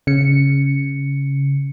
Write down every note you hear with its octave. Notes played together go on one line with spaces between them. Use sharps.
C#3 C#7